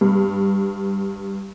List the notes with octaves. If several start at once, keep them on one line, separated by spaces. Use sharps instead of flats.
G2